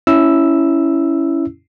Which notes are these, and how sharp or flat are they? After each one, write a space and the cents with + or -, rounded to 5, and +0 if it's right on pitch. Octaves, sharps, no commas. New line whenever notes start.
C#4 +5 E4 +0 E6 +0